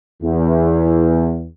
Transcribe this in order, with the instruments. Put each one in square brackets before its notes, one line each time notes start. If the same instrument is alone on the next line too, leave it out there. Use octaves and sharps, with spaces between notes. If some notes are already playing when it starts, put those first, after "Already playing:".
[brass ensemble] E2